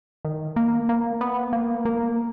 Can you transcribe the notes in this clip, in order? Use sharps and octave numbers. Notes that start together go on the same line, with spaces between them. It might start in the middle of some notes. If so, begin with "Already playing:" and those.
D#3
A#3
A#3
B3
A#3
A#3